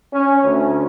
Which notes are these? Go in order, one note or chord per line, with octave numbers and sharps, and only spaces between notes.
C#4
D2